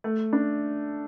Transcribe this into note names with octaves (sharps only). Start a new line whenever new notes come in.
A3
D4